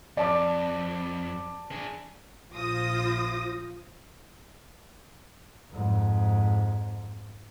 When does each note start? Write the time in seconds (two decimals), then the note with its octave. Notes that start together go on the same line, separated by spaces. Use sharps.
0.17 F2 D5 A5 D6
1.71 D4 G#4
2.53 A#1 F4 C5 D#6 A#6
5.72 F2 G#2